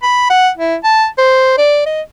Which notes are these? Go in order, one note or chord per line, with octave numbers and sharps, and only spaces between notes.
B5
F#5
E4
A5
C5
D5
D#5